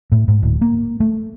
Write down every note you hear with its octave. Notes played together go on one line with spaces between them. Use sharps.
A2
G#2
D1
A#3
A3